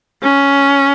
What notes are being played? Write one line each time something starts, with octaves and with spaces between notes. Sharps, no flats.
C#4